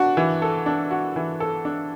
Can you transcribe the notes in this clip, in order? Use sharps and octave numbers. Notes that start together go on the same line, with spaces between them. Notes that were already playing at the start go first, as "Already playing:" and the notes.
Already playing: D4 F#4
E3
A4
D4
F#4
E3
A4
D4